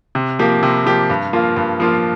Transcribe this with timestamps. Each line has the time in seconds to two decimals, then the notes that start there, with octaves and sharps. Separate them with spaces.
0.15 C3
0.39 F3 A#3 G4
0.63 C3
0.86 F3 A#3 G4
1.10 G2
1.33 F3 A#3 F4
1.57 G2
1.80 F3 A#3 F4